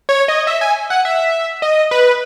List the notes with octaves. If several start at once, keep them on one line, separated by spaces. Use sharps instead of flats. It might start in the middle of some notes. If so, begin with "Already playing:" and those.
C#5
D#5
E5
G#5
F#5
E5
D#5
B4